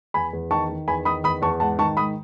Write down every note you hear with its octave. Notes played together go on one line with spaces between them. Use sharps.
E2 G#5 B5
E2
D#3 A5 C#6
D#3
E2 G#5 B5
D#3 B5 D#6
E2 B5 D#6
E2 A5 C#6
G#2 F#5 A5
D#3 A5 C#6
G#2 B5 D#6